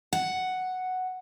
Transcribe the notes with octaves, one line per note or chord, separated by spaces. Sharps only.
F#5